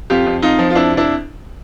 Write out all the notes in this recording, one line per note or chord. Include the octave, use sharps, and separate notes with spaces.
F2 F4 G4
F2
F2 D#4 F4
F3
F4
F2 D4 E4
C3 D4 E4